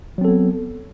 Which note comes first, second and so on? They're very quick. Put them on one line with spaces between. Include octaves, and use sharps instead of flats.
F#3 C4 A4 B3